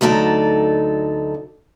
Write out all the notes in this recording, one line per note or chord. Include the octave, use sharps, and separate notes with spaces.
D2 F#3 D#4 A4 D5